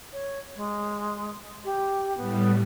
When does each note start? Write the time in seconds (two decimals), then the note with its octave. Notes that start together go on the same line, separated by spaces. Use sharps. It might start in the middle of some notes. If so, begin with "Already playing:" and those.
0.13 C#5
0.56 G#3
1.65 G4
2.17 A2 G3 B3